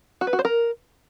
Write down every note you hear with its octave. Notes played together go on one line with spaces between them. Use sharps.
F#4
B4
F#4
C5
A#4